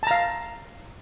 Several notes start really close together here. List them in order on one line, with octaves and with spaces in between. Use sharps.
A5 A#5 F5